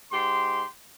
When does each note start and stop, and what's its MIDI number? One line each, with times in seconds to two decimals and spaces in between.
0.12 0.63 44
0.12 0.63 67
0.12 0.63 84